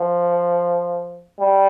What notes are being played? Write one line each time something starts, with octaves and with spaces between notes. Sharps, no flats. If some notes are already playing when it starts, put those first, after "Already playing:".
Already playing: F3
G3